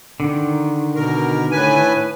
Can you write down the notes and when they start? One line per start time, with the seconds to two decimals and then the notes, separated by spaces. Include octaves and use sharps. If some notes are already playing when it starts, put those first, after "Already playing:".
0.20 D3 D#3
0.95 B2 A#4
1.51 A2 B4 G#5